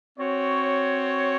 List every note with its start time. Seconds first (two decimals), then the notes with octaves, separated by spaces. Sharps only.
0.17 C4 F#4 C#5